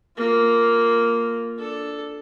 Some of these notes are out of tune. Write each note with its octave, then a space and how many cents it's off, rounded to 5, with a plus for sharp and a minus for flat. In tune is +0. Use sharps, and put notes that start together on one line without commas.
A#3 -5 F4 +0
D4 +0 A4 +0